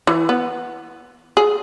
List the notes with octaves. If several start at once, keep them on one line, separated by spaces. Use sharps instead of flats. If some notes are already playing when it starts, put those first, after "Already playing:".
E3
B3
G#4